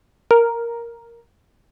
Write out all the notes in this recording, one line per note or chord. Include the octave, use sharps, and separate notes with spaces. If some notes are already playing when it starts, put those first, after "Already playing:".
A#4